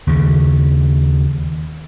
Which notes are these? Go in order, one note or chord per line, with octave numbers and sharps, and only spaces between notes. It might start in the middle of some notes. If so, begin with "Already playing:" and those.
D#2 C#3